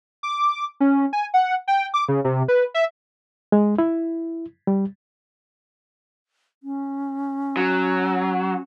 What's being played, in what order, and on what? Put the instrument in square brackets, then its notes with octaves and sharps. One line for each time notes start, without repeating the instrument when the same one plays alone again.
[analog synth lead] D6
C#4
G#5
F#5
G5
D6
C#3
C3
B4
E5
[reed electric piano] G#3
E4
G3
[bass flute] C#4
[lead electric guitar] F#3